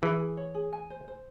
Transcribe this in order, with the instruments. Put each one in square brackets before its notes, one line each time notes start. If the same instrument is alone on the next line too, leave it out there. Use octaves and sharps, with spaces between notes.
[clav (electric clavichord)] E3 [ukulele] G#4
[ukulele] G#4
C#5
G#4
G#5
C5
C5